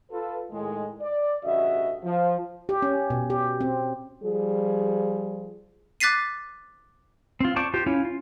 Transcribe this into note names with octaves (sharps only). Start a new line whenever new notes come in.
F4 A4 B4
A2 D#3 G#3
D5
A1 G2 C#3 F#4 D#5 E5
F3
G4
C#4
B2
G4
C4
F3 G3 G#4
D6 F#6 A6 B6 C7 D#7
C4 F4
C5 D5 A5 C#6 D6
F4 G4 C5
C#4 E4 F4 C#5
F4